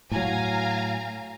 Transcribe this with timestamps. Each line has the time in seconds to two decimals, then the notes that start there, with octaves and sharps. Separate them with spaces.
0.11 A2 F#3 F5 G#5 A#5